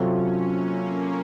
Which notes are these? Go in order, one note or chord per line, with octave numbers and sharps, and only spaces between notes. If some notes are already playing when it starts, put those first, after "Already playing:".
Already playing: C3 F#3 C4 C#4 F4 A4
A#3